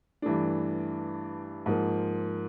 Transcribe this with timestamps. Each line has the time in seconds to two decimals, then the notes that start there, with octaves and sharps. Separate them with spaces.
0.22 G2 E3 A3 D4
1.66 G#2 F3 A#3